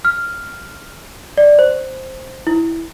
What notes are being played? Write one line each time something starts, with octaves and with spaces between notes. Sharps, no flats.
F6
D5
C5
E4